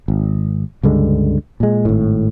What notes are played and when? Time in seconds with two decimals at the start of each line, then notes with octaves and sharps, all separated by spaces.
0.08 G#1
0.83 C#2 G2 D3 G#3
1.60 A#2 G#3
1.85 G#1 A2